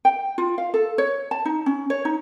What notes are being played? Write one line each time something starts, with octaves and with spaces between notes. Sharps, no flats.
G5
F4
F5
A4
C#5
A5
D#4
C#4
C#5
D#4